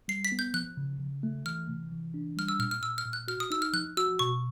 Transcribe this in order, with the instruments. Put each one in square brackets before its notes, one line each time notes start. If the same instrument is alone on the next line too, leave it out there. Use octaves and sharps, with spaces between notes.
[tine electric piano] G3 [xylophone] C7
[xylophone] B6
[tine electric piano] B3
[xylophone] G6
[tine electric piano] F3 [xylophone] F#6
[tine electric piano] C#3
C#3
A3
[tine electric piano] E3 [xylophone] F6
[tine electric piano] C3
E3
D4
[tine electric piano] G3 [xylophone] F6
[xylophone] E6
[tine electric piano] A#2 [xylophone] F6
[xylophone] F6
[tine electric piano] A#2 [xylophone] E6
[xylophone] F6
[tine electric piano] A#2
[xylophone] F#6
[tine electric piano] F#4 [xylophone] F6
[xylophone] D#6
[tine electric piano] D#4 [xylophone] E6
[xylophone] F6
[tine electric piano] F3 [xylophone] F#6
[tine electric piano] F#4 [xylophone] E6
[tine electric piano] B2 [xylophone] C#6